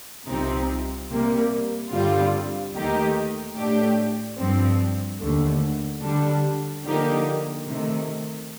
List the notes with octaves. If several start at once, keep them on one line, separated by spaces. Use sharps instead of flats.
C2 C3 F3 C4 D#4
C3 G3 A#3
G2 D3 G3 C4 F4
D#2 D#3 A3 D#4 G4
A2 A3 D4 G4
G2 F3 C4
D#2 D3 A3
D3 G3 D4
D3 F3 A#3 D#4 G4
C3 D#3 A3